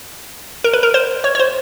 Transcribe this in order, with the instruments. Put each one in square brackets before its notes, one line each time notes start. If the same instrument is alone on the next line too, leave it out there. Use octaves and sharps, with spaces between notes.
[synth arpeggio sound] A#4
B4
A#4
C5
C#5
C#5
C5